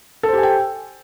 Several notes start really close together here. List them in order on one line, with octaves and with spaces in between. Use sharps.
A4 C5 G4 G#5 G5